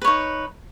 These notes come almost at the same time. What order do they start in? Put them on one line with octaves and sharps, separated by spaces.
B4 C#5 D#4